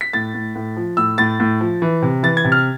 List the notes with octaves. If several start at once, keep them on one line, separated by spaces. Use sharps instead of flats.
B6
A2 A6
A2
A2
F3
A2 E6
A2 A6
A2
F3
E3
C3
E3 A6
G#6
C3
F6